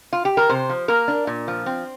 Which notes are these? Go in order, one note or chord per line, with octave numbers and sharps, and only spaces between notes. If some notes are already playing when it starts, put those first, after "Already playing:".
F4
G4
A#4
C3 C5
F3
A#3 A#4
D4
A#2
F3
C4